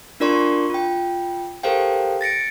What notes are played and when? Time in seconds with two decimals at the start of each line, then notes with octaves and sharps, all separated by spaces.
0.20 D4 F4 A#4 D5 C6 C#6
0.70 F4 G5
1.63 G4 A4 A#4 C5 F5 G5
2.21 A6 A#6 C#7 D7